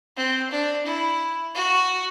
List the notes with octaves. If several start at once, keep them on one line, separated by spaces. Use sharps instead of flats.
C4
D4
E4
F#4